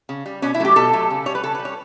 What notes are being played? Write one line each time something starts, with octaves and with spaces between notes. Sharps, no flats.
C#3
G3
B2 C#4
E4
F#3 A3 G4
B2 A4
F#3 A3
C#3
G3 C#5
B4
C#3 A4
B4
G3
C#5